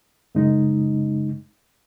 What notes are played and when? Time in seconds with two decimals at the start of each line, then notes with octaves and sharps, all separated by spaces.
0.35 F#2 C#3 G#3 D#4